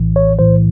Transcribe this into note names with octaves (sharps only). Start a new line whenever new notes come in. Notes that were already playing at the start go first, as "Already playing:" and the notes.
Already playing: A#1 A2 E3
C#5
B1 A2 E3 C5